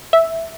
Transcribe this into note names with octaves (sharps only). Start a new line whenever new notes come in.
E5